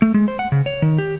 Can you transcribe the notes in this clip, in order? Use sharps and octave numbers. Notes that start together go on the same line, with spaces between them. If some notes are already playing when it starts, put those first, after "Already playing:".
A3
G#3
C5
F#5
C#3
C#5
D#3
G4